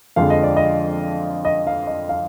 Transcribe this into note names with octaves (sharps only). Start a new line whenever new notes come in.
F2 D3 F3 G#3 F5
D#5
D5
D#5
D#5
F5
D#5
F5